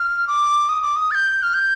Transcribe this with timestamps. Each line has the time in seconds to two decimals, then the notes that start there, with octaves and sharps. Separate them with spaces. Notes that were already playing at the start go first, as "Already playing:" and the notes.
Already playing: F6
0.27 D6
0.69 D#6
0.82 D6
0.96 D#6
1.11 A6
1.15 G6
1.42 F6
1.54 G6